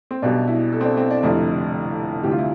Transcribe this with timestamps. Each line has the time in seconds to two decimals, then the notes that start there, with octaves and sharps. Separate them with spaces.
0.11 C4
0.22 B1 B2 G3 D4
0.47 E4
0.73 A4
0.81 C4
0.85 D4
0.97 C4
1.10 D4
1.23 F1 F2 D3 G3 E4
2.23 D2 C3 E3 G3 G4
2.31 F4
2.38 E4